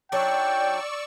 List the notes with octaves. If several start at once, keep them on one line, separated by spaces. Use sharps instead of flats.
F#3 D4 D#4 D5 G5 C#6 E6